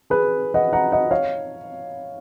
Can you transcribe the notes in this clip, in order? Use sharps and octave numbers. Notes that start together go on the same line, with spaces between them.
G#4 B4
D#5 F#5
F#5 A#5
D#5 F#5
C#5 F5